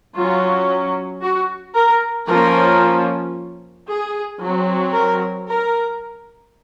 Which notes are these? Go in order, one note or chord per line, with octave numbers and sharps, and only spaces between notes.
F#3 C#4 F4
F#4
A#4
F3 A#3 C#4 A#4
G#4
F#3 C4
A#4
A#4